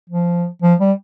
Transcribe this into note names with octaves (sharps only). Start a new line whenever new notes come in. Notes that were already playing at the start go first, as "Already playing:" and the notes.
F3
F3
G3